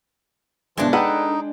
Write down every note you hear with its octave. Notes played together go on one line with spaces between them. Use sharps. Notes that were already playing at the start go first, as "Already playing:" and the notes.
G1 B2 E3 F3 G#3 D4
D#4 G#4 A4 B4 F#5 G5